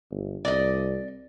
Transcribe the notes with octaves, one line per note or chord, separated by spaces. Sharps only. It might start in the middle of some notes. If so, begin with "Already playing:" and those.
G1
C2 D5 D#5